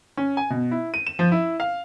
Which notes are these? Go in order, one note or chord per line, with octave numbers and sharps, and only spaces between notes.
C#4
G#5
B2
E4
D#7
E7
F3
E4
F5